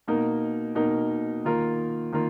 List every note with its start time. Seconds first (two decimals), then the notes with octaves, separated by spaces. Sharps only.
0.08 B2 A#3 D#4 A#4
0.75 B2 A#3 D#4 A#4
1.45 D#3 A#3 F4 A#4
2.12 D#3 A#3 F4 A#4